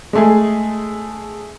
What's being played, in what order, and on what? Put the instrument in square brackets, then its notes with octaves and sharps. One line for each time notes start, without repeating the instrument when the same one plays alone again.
[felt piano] G#3 A3 G#4